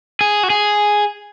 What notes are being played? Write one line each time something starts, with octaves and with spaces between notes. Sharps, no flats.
G#4
F#4
G#4